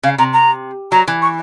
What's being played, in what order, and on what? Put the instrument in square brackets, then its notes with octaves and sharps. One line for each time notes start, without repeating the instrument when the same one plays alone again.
[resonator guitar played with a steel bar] C#3 [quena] F5
[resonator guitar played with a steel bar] C3 [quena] A#5
[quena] A#5
[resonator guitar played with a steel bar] F#3 [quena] A#5
[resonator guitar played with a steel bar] E3
[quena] C#6